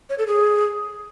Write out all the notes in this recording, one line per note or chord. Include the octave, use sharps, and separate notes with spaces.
C#5
A4
G#4